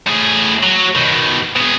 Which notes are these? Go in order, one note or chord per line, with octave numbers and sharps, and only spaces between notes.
A2 G#4
F#3
B2 D#3
B2 G#4